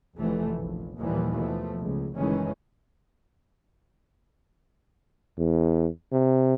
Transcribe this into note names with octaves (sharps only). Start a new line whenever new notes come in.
F1 E3 A3
A#1
D#2 A#2 E3 F3 G3
B2 F3 A3
C#2
F#1 D#3 E3 G#3 A3 C#4
E2
C3